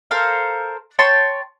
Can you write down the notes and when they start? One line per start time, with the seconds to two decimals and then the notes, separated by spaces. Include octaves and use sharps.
0.11 A4 A#4 C5 F5
0.99 C#5 G5 A5 C6